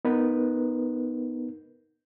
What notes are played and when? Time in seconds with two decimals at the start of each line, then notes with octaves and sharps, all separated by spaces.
0.05 B3 D#4 A#4 B4